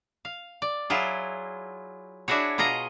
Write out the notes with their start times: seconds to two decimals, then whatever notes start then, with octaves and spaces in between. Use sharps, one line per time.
0.25 F5
0.62 D5
0.90 F#3 E4 F4 G#4
2.28 D4 E4 F#4 G#4 C#5
2.58 B2 F4 G#4 D#5 A#5